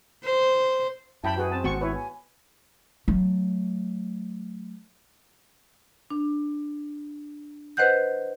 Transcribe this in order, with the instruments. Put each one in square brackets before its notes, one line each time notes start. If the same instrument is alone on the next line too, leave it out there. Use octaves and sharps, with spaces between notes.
[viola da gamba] C5
[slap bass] F#2 [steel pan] E4 G5 B5 [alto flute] A5
[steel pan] F#4 G#4 [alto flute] B4
[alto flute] C4 [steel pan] A5
[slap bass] G#1 B3 [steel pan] F#4 C#6
[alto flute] E4 [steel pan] B4 C#5
[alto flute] G#5
[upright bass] F#3 A3
[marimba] D4
B4 C5 D#5 F#5 F#6 G6